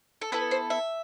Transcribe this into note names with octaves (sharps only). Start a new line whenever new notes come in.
A4
B3 E4 A4 B4
C5
E5